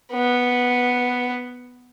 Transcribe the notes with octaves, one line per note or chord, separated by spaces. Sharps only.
B3